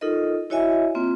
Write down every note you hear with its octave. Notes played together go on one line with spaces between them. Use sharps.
D#4 F4 A4 A#4 D#5
E4 F#4 C#5 D#5 E5 G#5
A#3 C4 F4